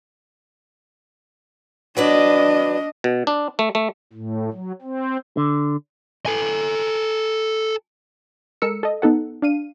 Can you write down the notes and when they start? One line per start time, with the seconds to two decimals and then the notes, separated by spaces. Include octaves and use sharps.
1.97 F#3 D4 B4 D5 D#5
3.04 B2
3.27 D4
3.59 A3
3.75 A3
4.13 A2
4.53 F#3
4.82 C4
5.37 D3
6.26 A4 G#5
8.62 G#3 A4 A#4 E6 C#7
8.83 A4 D#5
9.02 B3 D#4 A4 F#5
9.42 D4 F5 D#7